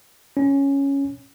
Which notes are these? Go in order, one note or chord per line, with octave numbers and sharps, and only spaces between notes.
C#4